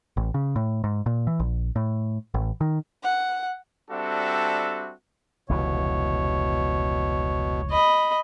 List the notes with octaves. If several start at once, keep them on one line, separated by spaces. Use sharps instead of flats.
A1
C#3
A2
G#2
A#2
E3
A#1
A2
A1
D#3
F#5
G3 C4 D4 F#4 A4 E5
F1 C#2 B2 E3 C#5
D#5 B5